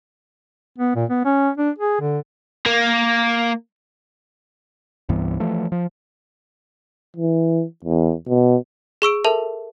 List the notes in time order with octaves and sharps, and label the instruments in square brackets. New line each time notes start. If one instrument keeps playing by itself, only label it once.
[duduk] B3
A#2
B3
C#4
D4
G#4
D3
[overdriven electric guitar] A#3
[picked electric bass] C2 G2 E3 B3
E3 F3 A3
F3
[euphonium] E3
E2
B2
[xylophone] G#4 C#6 E6 D7
A4 A#4 E5 A5